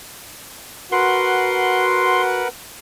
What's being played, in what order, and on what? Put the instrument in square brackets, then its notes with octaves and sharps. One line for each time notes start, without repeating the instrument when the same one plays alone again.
[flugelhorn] F#4 [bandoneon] A#4 B4 F#5 [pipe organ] C6